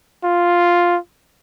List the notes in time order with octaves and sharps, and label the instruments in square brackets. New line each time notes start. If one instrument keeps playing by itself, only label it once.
[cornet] F4